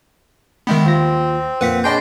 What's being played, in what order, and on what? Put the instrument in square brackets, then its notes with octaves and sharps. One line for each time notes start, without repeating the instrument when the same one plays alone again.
[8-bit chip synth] D#3 G#3 B3 [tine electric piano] E5 G5 B5
[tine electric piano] D#2 F4 A#6 [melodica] C4
[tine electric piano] F2 A#2 A#3 [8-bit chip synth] B4 F#5 B6
[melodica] D4 C6 [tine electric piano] G#4 C#5 B5 [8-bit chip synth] D#5 G5 G6